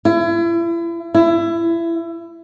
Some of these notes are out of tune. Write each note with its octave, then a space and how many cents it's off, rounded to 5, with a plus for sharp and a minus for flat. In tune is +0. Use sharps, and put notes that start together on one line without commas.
E4 +35
E4 +25